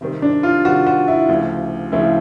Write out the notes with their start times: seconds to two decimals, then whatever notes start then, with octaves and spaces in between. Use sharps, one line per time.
0.01 C3 D#3 G3 C4
0.22 D4
0.43 F4
0.64 C3 D#3 G3 C4 F#4
0.86 F#4
1.08 E4
1.29 D2 C#3 F3
1.92 D2 C#3 F3 E4